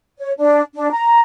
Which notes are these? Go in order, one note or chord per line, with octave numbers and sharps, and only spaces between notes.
C#5
D4
D4
A#5